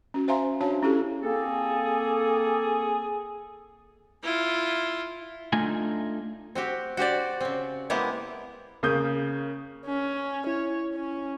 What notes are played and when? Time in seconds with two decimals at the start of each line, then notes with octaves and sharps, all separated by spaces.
0.14 C#4 F#4
0.28 C5 E5 F5 G#5 A#5 C6
0.61 D4 F#4 C#5 F5 G#5 A5
0.83 C#4 E4 G4 A4
1.22 A#3 C4 G#4 A4
4.23 E4 F4
5.53 A3 D4 D#4 F4 G#5
6.55 C4 F#4 G4
6.97 F#4 G4 C5 D5
7.40 C#3 C4
7.90 G#3 A#3 B3 E4 G4
8.83 C#3 A#3 D#6 G6
9.86 C#4
10.47 E4 C#5
10.94 C#4